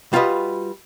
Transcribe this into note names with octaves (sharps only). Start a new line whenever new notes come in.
G3 F4 F#4 A#4 B4 D#5